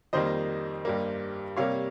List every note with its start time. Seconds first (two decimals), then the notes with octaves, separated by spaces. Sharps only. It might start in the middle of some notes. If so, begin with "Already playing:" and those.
0.13 F2 D#3 G3 A#3 C5 D#5
0.85 G2 G3 A#3
1.56 C3 G3 A#3 C#5 F5